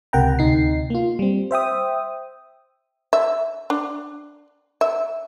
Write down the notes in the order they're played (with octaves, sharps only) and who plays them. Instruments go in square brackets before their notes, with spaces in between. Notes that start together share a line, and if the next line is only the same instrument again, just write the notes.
[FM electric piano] C#2 C3 A#4 F#5 G5 A#5
D2 C3 D#4 C7
A#3 F4
G3 C4
C5 E5 G5 D#6
[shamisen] E5
D4
E5